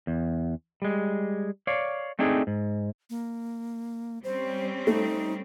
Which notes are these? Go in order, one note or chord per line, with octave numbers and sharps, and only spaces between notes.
E2
G3 G#3
C#5 D5 F5
A3 C4 D4 D#4 G#4
G#2
A#3
G3 C4 C#4 C5
A3 D#4